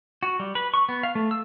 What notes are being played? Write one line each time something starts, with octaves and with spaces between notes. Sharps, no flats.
F#4
G3
B4
C#6
B3
F5
A3
E6